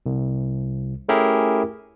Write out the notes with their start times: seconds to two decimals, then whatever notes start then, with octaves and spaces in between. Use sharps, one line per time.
0.06 C2
1.09 A3 C#4 E4 G4 G#4 A#4